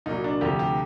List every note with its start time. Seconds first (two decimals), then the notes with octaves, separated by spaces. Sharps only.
0.06 C2 A#2 F#3 D#4
0.24 D4
0.41 D2 C3 F3 G4
0.59 G4